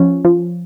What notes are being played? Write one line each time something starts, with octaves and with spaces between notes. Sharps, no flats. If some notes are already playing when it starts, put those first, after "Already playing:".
Already playing: F3 C#4
F3